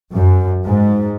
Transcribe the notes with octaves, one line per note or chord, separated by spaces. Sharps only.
F#2
G#2